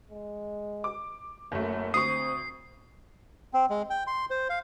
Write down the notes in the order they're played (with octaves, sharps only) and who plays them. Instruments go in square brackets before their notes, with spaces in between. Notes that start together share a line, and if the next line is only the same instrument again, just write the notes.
[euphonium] G#3
[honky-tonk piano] D6
[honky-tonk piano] F#1 A3 [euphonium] F#2
[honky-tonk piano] D2 C#6 [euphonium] C4 [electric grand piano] D#6 [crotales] C7
[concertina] C4
G#3
G5
C6
C5
F5